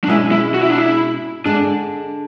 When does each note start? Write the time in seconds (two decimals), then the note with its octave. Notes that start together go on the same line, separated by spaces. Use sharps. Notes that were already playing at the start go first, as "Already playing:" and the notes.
0.04 D4
0.08 B2 G#3 C#4 E4 G#4 C#5
0.31 E4
0.54 F#4
0.62 E4
0.70 D4
0.78 E4
1.46 D3 G#3 D4